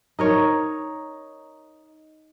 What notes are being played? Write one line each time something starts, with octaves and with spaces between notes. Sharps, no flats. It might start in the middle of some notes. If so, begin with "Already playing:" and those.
D#4 A#4 C#5